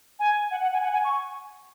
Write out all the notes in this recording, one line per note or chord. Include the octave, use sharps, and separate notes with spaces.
G#5
F#5
F#5
G#5
F#5
G#5
C#6